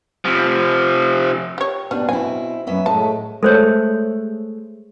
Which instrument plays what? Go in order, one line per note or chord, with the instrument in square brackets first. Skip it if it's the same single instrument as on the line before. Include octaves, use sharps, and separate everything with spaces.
[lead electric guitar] C3 F3
[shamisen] G4 C#5
[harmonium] B2 [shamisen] G3 [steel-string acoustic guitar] B3 D4
[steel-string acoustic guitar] C4 E4 [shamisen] G#5
[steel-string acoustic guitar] F#2 C#4 E5 [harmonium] B3
[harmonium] A2 A3 [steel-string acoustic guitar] G#3 [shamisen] A5
[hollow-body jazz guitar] G#3 A3 [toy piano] A4 C5 C#5